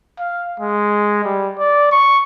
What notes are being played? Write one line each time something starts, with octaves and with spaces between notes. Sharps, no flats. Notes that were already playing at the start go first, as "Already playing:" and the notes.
F5
G#3
G3
D5
C#6